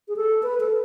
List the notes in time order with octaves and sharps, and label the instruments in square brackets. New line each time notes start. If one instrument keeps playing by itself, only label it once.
[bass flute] G#4
A4
B4
A4